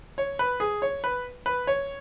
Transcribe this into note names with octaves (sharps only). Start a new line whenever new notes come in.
C#5
B4
G#4
C#5
B4
B4
C#5